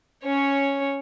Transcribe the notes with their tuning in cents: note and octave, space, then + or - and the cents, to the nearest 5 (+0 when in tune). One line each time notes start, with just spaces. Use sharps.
C#4 +0 C#5 +0